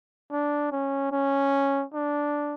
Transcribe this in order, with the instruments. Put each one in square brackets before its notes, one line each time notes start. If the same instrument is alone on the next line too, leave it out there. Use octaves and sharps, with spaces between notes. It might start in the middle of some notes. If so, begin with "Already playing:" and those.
[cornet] D4
C#4
C#4
D4